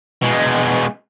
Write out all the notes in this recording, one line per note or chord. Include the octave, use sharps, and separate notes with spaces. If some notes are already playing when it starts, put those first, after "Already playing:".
B2 G#3